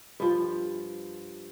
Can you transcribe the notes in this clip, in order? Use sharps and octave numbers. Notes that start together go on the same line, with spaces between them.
G2 F3